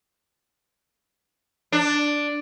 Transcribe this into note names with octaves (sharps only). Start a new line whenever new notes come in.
D4